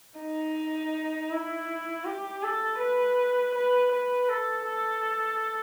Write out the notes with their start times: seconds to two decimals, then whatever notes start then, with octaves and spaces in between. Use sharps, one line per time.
0.19 D#4
1.31 E4
2.05 G4
2.43 A4
2.80 B4
3.55 B4
3.92 B4
4.29 A4
4.67 A4